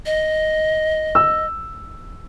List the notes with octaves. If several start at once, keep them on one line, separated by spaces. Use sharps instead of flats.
D#5
E6